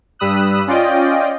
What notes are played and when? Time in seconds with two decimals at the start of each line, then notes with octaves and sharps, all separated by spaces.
0.19 G2 G3 B5 D#6 E6 F#6
0.67 C#4 F4 D5 D#5 G5